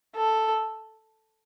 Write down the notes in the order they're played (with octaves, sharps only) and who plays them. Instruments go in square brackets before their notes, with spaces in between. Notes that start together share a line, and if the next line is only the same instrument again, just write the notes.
[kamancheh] A4